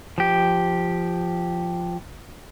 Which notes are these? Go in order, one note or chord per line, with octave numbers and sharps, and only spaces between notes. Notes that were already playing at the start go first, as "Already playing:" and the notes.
F3 G4